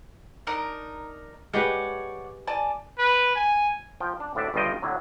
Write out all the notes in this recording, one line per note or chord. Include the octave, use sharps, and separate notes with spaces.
D4 D#4 A#4
G#3 G4 B4 C#5 D5 F#5
D5 G#5 A5
B4
G#5
F3 G5
D4
D2 A2 D4 D5 E5
G1 C#2 G2 F4 D#5 G5
A2 D3 F#3